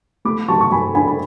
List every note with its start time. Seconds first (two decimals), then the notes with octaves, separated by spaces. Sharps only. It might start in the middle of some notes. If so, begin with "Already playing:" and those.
0.25 A3 B5 D6
0.48 F#3 A5 C#6
0.61 C#6
0.71 F#3 G#5 B5
0.95 D4 G#5 B5
1.07 B5